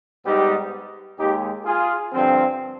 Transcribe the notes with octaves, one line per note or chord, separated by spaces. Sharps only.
G#2 G3 B3 D#4 G4
D#2 D#3 G#3 D#4 G4
F4 G#4
G2 D3 F3 C4